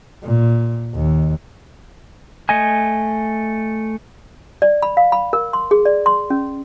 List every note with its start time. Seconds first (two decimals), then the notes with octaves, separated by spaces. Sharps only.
0.23 A#2
0.95 D#2
2.49 A3 D#5 G#5
4.62 D5
4.82 B5
4.97 F5
5.12 B5
5.33 A#4
5.53 C6
5.71 G#4
5.86 D5
6.06 C6
6.30 C#4